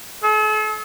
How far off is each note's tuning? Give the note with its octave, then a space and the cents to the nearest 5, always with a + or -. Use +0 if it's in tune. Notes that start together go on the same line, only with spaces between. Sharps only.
A4 -45